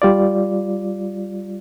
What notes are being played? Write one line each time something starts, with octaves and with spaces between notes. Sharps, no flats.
G3 F4 D5